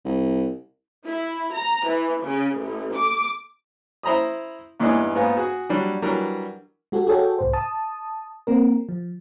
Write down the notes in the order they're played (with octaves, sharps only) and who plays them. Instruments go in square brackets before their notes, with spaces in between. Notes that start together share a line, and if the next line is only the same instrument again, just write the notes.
[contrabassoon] C2
[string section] E4
A#5
E3
C#3
A1
D6
[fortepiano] E4 C5 A#5 B5 D#6
E2 G2 E3 G#3 D#4
G#2 B3 F4 G#5
F#4 G#4
F#3 G3 D4
E3 F#3 G3 D4 A#4
[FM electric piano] G#3 F#4 G4 A4
F#4 G#4 A4 C#5 G5
C2 G#2 C5
A5 D#6
A#3 C4 A#4
F3